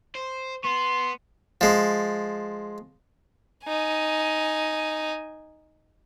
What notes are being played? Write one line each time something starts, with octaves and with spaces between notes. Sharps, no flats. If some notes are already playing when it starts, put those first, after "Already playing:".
C5
B3 C6
F3 G#3
D#4 G#5